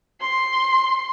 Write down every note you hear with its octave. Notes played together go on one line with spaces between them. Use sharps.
C6